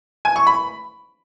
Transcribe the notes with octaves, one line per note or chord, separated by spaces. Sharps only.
G#5
C#6
B5